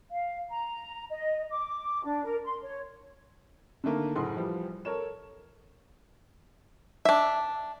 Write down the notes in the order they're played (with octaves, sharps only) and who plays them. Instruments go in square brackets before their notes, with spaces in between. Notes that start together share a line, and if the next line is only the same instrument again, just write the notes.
[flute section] F5
A#5
D#5
D6
D4
A#4
C6
C#5
[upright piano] D3 D#3 A3 A#3
F#1 A2 G#4 F#5 C6
E3 F3 G3
A4 A#4 C#5 E7
[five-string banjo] D4 E5